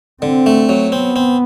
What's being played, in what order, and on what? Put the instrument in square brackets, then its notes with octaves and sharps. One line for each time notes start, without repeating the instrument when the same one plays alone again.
[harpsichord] D3 [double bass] C4
[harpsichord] A3
F#3
[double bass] B3 [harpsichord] C4
[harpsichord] C4